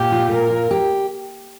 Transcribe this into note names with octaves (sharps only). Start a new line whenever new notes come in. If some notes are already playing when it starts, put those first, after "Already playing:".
Already playing: A#2 G4
F4
A#2 A#4
F4
G4